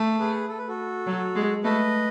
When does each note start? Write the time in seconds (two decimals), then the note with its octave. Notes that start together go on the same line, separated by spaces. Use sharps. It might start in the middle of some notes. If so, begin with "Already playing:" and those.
Already playing: A3
0.19 G#4 B4
0.48 A4
0.58 B4
0.68 F#4 A4
1.06 F#3
1.35 G#3
1.64 A3 B4 D#5